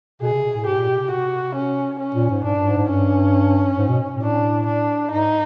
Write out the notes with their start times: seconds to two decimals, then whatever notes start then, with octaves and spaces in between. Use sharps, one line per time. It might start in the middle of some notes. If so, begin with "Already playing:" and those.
0.22 B2 G#4
0.33 C3
0.44 B2
0.55 A2
0.66 G#2 G4
0.78 A#2
0.88 B2
1.00 C3
1.11 F#4
1.55 C#4
2.00 C#4
2.15 A#2
2.30 G#2
2.44 G#2 D4
2.55 G2
2.67 G#2
2.78 G#2
2.89 G2 C#4
3.78 G#2
3.89 B2
4.11 A2
4.22 D4
4.66 D4
5.11 G#2 D#4